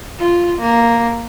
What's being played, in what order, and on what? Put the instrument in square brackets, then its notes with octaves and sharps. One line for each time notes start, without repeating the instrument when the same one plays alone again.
[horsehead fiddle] F4
A#3